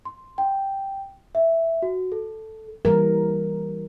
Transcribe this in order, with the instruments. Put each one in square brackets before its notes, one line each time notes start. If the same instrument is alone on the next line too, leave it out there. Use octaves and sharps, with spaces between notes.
[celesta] C6
G5
E5
F#4
A4
[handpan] E3 G3 A#4